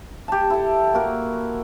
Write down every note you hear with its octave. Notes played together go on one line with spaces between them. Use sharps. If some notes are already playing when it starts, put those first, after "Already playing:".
G4 A5
E4 A4
A#3 F#4 A#4